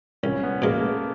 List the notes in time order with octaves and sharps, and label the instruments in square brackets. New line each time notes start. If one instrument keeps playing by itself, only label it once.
[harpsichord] C2 [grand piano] C#4
[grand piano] B3
[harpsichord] B2 G#3 [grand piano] A#3
[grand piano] A3